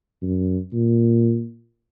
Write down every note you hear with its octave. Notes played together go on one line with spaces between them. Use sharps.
F#2
A#2